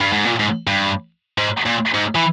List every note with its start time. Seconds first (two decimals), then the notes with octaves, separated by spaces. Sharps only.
0.01 G2
0.12 G#2
0.25 A#2
0.39 G#2
0.67 G2
1.38 G#2
1.66 A#2
1.95 G#2
2.15 E3